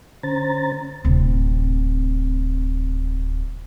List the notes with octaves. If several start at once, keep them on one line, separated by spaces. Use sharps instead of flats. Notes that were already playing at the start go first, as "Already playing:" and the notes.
D3 C#4 C5 A#5 A6
D1 C3